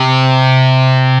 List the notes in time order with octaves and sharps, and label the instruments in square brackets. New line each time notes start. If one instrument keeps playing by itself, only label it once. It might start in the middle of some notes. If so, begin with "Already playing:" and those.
Already playing: [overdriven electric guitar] C3